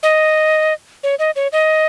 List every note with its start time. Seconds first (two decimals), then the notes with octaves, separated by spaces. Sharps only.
0.03 D#5
1.03 C#5
1.19 D#5
1.36 C#5
1.53 D#5